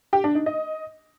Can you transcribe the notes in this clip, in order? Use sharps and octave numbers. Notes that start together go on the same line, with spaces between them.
G4
D4
D#4
D#5